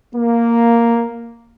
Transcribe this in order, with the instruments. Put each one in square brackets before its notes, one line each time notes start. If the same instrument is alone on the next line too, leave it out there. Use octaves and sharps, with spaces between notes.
[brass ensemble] A#3